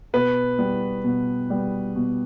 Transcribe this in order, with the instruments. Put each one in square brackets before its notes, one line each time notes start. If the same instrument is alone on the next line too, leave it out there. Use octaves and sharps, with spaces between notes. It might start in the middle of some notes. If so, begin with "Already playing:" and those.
[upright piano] B2 [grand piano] B4
[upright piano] G3 B3
B2
G3 B3
B2